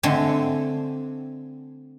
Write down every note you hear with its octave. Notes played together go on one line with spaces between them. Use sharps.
D3 A3 C4 G#5